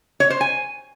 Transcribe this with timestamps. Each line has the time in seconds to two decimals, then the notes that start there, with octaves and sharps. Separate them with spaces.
0.20 C#5
0.30 C5
0.41 G#5